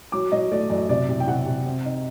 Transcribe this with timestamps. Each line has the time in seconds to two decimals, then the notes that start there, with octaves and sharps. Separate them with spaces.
0.12 F#3 D6
0.32 F#3 D#5
0.52 A3 D5
0.70 F#2 D5
0.89 C3 D5
1.09 C3
1.20 G5
1.27 C3 F#5
1.46 C3
1.66 C4
1.85 D#4